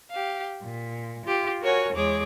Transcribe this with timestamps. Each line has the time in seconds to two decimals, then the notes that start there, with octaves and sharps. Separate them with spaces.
0.11 G4 F5
0.62 A#2
1.25 F4 G4
1.61 F#4 A#4 C#5 F#5 G#5
1.93 E2 G#3 G#4 C#5 D6